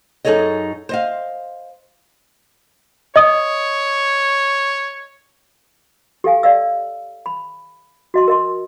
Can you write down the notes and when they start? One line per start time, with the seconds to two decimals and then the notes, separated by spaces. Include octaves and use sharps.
0.25 F#2 D#4 G#4 A4 C#5 D#5
0.89 C5 D#5 F5
3.16 C#5 D#5 D#6
6.24 G4 A4 F5 G#5
6.43 D5 D#5 F5 E6
7.26 B5
8.14 F#4 D#5 C6
8.28 A#4 D#5 C6